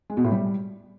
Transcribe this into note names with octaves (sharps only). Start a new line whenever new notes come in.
G#3
B2
A2
G3